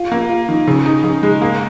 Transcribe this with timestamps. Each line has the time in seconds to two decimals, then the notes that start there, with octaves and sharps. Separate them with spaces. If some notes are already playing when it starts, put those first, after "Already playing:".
Already playing: F4
0.12 A#3
0.29 F4
0.49 D#3
0.67 C#3
0.86 D#4
1.04 C#3
1.23 G#3
1.42 A#3